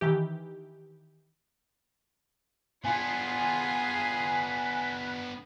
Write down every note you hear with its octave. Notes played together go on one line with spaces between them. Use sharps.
D#3 E3 G4
B3 D4 F4 G#4 B4 G#5